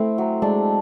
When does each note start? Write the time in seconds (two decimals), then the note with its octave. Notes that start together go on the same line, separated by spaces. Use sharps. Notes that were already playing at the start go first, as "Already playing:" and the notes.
Already playing: A3 C4 E4
0.18 F#3
0.42 G#3 D4